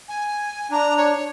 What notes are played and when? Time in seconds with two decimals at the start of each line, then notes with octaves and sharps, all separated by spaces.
0.08 G#5
0.71 D4 A#5
0.98 C#5